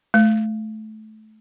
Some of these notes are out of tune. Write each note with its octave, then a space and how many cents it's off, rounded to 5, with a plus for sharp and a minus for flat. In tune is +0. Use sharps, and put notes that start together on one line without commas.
A3 -20